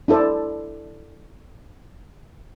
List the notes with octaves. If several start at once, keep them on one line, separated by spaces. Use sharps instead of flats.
D4 E4 A4 C5 D5